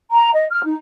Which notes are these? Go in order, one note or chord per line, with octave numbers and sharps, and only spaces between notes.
A#5
D#5
F6
D#4